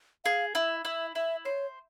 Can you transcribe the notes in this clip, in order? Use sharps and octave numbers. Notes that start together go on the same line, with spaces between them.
G#4 F5
E4 E5
E4 E5
E4 E5
C5 C#5